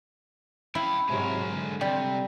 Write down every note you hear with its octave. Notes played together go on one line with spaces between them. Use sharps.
E4 F5 G5
G#2 C3 F#3 G#3 A#4
D3
C3 G3